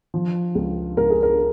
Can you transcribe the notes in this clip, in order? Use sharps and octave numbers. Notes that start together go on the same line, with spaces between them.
F3
C#2
C#2 A#4
G#4
A#4